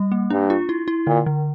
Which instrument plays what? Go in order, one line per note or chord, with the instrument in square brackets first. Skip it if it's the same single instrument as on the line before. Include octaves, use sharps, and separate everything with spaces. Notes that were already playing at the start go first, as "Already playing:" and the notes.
Already playing: [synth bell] G3
A#3
[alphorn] G2 [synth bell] D4
[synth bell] F4
E4
E4
[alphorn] A#2 [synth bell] D3
[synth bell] D3